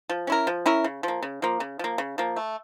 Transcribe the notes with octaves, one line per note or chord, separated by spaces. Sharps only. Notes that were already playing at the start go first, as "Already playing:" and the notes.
F3
C#4 E4 A#4
F3
C#4 E4 A#4
C#3
F3 A#3
C#3
F3 A#3
C#3
F3 A#3
C#3
F3 A#3
A3